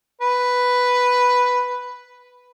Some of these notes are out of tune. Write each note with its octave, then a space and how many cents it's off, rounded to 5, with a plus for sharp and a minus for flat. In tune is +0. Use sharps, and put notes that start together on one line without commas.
B4 +0